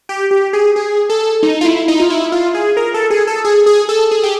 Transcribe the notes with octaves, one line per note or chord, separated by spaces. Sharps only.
G4
G4
G#4
G#4
A4
D#4
F4
E4
D#4
F4
E4
F4
G#4
A#4
A4
G#4
A4
G#4
G#4
A4
G#4
G4